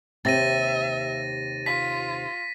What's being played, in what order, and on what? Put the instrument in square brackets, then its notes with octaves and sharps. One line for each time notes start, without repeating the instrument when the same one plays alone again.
[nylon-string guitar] D#2 C3 C4 [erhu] E5 [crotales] A6 A#6 D#7
[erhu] F4 [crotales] B6